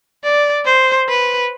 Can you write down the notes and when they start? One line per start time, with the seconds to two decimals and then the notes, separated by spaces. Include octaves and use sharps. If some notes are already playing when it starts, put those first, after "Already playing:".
0.23 D5
0.65 C5
1.08 B4